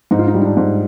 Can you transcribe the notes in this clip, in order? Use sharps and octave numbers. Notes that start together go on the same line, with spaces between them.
G#2 D#4
F4
D#4
G3
D#4
D4
G#2